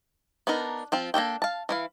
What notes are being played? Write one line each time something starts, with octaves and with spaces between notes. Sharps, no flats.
B3 D4 D#4 A#4
F3 C4 F4
A#3 D4 A4 G5
F5 A5
E3 E4 F5